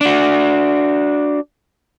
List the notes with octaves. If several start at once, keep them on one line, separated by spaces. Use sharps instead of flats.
D4 F#4